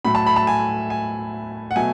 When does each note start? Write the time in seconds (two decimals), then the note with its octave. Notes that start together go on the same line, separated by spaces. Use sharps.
0.05 A2 F#3 A3 B5
0.15 A5
0.26 B5
0.36 A5
0.47 G#5
0.90 G#5
1.71 F#5
1.76 B2 F#3 A3 G#5